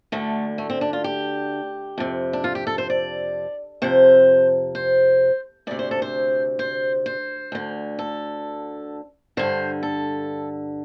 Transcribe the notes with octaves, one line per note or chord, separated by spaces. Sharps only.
D2 D3 A3
A3
C4
D4
F4
G4
F2 C3
D4
F4
G4
A4
C5
D5
F2 C3 C5
C5
D2 C3 D5
C5
A4
C5
C5
C5
D2 D3
A4
G2 D3 C5
A4